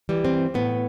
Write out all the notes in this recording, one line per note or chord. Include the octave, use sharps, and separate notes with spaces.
E3 G3
C4
A2 B3